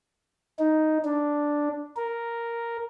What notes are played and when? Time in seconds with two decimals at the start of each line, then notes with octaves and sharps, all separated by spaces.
0.59 D#4
1.05 D4
1.97 A#4